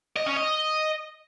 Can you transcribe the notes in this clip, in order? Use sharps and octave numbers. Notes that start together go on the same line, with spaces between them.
D#5
C#4
D#5